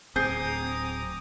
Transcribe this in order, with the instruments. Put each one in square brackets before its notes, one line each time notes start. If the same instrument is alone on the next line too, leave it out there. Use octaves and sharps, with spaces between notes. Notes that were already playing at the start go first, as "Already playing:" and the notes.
[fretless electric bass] D1 C4 [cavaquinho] G#4 [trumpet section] A#5 D6 D#6 [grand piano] G6 C7